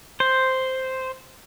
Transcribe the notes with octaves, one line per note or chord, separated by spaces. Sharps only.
C5